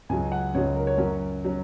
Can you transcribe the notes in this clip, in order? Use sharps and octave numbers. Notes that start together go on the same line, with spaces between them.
C#2 C#3 F#3 G#5
F#5
C#2 C#3 F#3 C#5
A#4
C#5
F#2 F#3 C#4 A#4
F#3 C#4